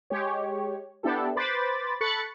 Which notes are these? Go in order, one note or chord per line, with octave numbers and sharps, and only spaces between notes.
G#3 G4 C#5
B3 D4 E4 G4 A4
B4 C5 B5 D6 A6
A4 B5 C#6 F#6 A6 C#7